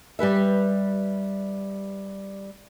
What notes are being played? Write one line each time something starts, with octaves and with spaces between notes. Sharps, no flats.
G3 G4 B4 E5